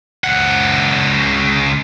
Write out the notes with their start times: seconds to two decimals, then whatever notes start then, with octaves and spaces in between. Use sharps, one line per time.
0.24 C#2 F#5